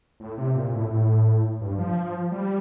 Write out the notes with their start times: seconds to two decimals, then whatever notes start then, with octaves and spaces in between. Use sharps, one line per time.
0.20 A2
0.38 C3
0.55 A#2
0.73 A2
0.90 A2
1.61 G2
1.78 F3
2.32 G3